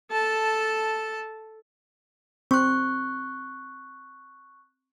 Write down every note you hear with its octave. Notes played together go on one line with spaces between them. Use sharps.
A4 A5
C4 C#6 F#6